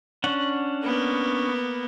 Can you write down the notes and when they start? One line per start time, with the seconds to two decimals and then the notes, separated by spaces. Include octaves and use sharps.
0.24 C#4 D4 F#5
0.83 A#3 B3